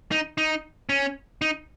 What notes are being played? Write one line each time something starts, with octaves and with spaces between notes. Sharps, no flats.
D#4
D#4
C#4
D#4